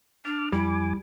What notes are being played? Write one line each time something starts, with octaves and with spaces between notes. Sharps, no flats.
D4 A5 D6 F6
F2 G3 E4 G#5 D6